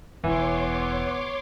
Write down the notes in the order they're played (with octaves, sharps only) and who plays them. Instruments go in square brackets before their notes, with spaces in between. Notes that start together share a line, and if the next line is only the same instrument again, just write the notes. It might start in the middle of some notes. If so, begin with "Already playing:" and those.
[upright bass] E1 [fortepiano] E3 [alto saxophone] B3 [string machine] C#5 C6 D6